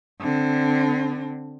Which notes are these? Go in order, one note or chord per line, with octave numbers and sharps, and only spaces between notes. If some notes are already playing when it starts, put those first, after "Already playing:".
D3 C4